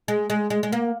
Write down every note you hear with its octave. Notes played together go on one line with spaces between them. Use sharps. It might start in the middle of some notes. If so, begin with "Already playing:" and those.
G#3
G#3
G#3
G#3
A#3